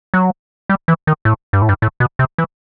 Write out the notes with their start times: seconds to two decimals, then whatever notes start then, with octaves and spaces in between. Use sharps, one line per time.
0.14 F#3
0.69 G3
0.88 E3
1.07 D#3
1.25 A2
1.53 G2
1.62 A2
1.69 G2
1.82 A2
2.00 B2
2.19 C3
2.38 E3